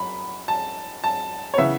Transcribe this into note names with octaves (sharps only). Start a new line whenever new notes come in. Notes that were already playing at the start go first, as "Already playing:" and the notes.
Already playing: F#2 B5
A5
A5
C#5
C#3 E3 B3 E5